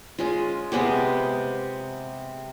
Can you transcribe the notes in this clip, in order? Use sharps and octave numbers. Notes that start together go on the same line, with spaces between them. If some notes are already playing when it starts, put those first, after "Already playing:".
G#3 C#4 F4
C3 G#3 B3 G4